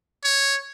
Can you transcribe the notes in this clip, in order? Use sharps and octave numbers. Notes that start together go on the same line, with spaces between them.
C#5